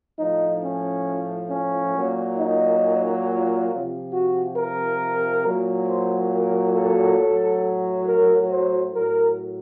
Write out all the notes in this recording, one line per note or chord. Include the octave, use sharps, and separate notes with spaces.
A2 F3 D#4
C#4
C#4
A#2 F#3
D#4
F4
C3 F3
F#4
A#4
A#2 F#3
C5
A#4
A4
A2 F#3
A#4
C5
A2 F#3 A#4